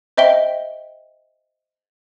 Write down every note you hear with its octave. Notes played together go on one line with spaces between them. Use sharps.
C5 D#5 E5 G5 G7